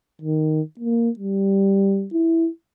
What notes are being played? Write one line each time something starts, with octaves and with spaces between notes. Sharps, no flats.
D#3
A#3
G3
E4